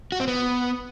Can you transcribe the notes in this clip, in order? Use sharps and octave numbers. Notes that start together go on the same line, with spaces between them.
F#4
C4
B3